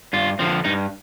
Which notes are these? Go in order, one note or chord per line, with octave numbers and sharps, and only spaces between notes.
G2 F4
D3 F3 C4
G2 D#4